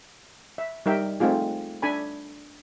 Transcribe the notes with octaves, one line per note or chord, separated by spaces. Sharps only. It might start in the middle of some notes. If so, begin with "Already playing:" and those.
E5
G3 D#4 A#4 E5 G5
A3 C4 D#4 F4 G#4
D4 A4 G#5 B5